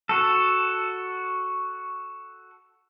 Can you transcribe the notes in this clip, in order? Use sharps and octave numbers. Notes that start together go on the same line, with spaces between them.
F#4 A4